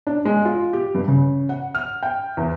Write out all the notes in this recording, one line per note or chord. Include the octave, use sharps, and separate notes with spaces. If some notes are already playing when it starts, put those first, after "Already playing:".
D4
G#3
F4
G4
G2
C#3
F#5
F6
G5
E2